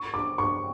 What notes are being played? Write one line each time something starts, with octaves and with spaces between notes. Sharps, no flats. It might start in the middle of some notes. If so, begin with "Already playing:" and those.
Already playing: C#6
D6
C#6